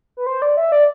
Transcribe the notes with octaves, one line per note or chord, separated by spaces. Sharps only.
B4
C5
D5
E5
D5